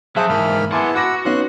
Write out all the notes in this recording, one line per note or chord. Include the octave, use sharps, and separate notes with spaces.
F#3 F#4 G#4 C5 E5 A5 D#6 F#6
G#2 E3 A#3 B5 F6
B3 E4 G#4 F#5 G#5 A5 C6 D6
F#4 F#5 B5 D6 E6 A#6
B3 C#4 D#4 C6 F#6